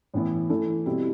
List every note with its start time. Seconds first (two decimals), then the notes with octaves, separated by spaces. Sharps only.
0.14 A2 E3 B3 E4
0.50 E3 A3 E4 A4
0.86 B2 G3 C4 E4